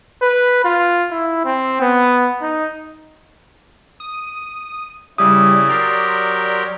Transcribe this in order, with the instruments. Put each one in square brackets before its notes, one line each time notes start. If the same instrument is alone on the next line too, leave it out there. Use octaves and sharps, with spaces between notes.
[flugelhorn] B4
F4
E4
C4
B3
D#4
[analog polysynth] D#6
[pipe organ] C#3 E4 [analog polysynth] G3 G4 [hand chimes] D#6
[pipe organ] F#3 G4 A#4 [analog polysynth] D5 C6